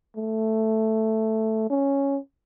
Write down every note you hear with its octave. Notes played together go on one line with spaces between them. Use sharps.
A3
C#4